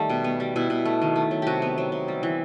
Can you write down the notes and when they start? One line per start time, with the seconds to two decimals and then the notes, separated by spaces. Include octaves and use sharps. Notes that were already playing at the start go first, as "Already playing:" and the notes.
Already playing: D#3 G3 A3
0.10 B2
0.24 B3
0.40 G3
0.56 B2 E4
0.70 B2
0.85 A3
1.02 D#3
1.16 A3
1.31 F#3
1.42 C3 F#4 G4
1.62 B3
1.78 F#3
1.92 C3
2.08 G3
2.23 E3